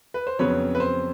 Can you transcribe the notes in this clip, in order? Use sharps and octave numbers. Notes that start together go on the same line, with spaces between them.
B4
C5
F2 C#3 F#3 B3 B4 C#5
B4
C5